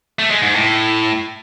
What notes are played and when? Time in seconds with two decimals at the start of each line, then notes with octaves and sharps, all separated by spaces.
0.19 A3
0.31 G#3
0.42 G#2
0.54 A2